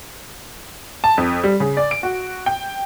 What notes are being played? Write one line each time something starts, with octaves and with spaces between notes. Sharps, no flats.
A5
F2
G3
C#3
D5
D7
F#4
G5